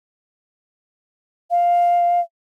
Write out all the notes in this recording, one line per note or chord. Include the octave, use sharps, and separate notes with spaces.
F5